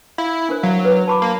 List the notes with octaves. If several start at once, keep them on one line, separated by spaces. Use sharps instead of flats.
E4 F5
D4 A#4 C5
F#3 F5
B4
A5 B5 D6
A#3